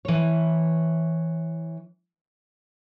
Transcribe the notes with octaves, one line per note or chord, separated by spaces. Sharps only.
E3 C#5